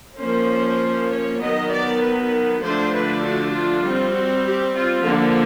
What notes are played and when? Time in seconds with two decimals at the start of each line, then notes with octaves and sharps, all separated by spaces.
0.19 F3 A#3 C#4 C5
1.10 C#5
1.41 D#3 F#3 B3 D#5
1.70 D5
2.01 B4
2.61 D3 F3 A3 D4 C5
2.92 B4
3.22 F#4
3.52 F4
3.83 G3 C4
4.14 F#4
4.44 G4
4.73 F4
5.04 D3 F3 A#3